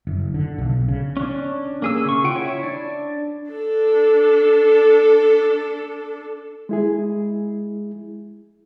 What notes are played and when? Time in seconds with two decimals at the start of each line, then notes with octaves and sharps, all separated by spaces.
0.07 F#1
0.34 D3
0.58 B1
0.88 C#3
1.17 C#4 D4
1.82 A#3 G#4 E6
2.05 C#3 C#6
2.24 F4 F#5 G5
2.36 E4 C#5
2.63 D4 D5
3.51 D4 A4
6.69 G#3 E4 G#4